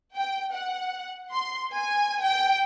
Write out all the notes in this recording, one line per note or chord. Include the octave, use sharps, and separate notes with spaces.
G5
F#5
C6
G#5
G5